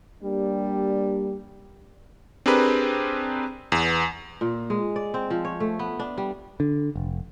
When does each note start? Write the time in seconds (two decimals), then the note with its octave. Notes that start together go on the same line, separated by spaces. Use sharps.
0.24 G3 A#3 D4 G4
2.46 C4 D4 G4 G#4 A#4 B4
3.72 E2 B3
4.41 A#2
4.70 G#3
4.96 D5
5.14 C4
5.30 F3
5.45 C#5
5.60 A3
5.79 B3
5.99 D4
6.18 G3
6.60 D3
6.96 F1